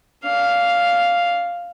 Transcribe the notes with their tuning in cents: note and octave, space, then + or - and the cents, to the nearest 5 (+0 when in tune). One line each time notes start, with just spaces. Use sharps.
D4 -35 F5 +0